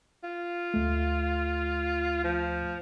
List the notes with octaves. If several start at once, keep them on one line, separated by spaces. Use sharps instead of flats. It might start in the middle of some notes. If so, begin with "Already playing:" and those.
F4
D2 A3
F3